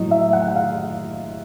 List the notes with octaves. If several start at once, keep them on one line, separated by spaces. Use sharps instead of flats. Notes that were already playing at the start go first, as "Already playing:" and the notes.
Already playing: A2 F#3 D#5
E5
F#5
F#5
F5